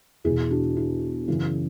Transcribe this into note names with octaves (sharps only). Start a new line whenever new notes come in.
E2 B2 E4 G#4
D4 F#4
E4
F#2 C#3 E3